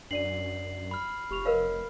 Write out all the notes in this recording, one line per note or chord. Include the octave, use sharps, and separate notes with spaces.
F#2 D4 D5 C7 D#7 F#7
B5 F6
F1 G4 C#6 F7
A#4 B4 C#5 D#5 F5